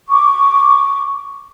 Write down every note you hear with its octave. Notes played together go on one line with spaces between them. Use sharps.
C#6 D6